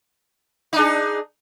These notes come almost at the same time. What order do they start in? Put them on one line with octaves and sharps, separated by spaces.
D#4 D4 G#4